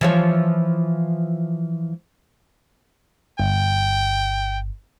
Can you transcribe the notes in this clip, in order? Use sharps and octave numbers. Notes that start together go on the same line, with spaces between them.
E3 F3 C#5
G1 G5